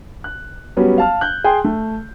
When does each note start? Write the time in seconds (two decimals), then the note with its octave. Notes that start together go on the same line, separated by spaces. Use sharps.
0.24 F#6
0.77 F#3 G3 B3 C#4
0.98 F5 A5 F6
1.21 F#6 G6
1.44 G#4 G5 C6
1.64 A3